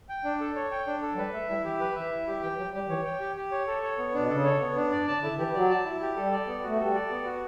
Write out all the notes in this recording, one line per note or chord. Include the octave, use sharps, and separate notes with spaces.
G5
D4
A4
C#5
G5
D4
A4
F#3
G3 B4
A3 E5
G3 E4
E3 G4
F#3 B4
E3 E5
E4
G3 G4
E3 G5
F#3 G4
G3 G4
E3 C#5
G5
G4
G4
C#5
A4
C#5
B3
B2 D4
C#3 A4
C#5
B3
D4
G2 D5
C#3 A5
D3 E4
E3 G4
F#3 D5
A5
E4
G4
G3 A4
D5
B3
A3 F#4
G3 A4
D5
B3
F#4